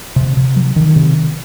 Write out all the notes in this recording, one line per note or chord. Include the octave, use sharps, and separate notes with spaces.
C3
C3
F#3
D#3
C3